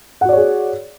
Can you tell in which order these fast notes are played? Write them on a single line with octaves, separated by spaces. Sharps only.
F#5 F#4 D5 C#5 G#4